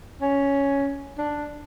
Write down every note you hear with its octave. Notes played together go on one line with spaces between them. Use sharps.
C#4
D4